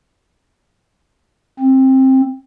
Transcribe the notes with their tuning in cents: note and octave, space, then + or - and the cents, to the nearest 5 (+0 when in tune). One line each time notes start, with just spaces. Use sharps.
C4 +15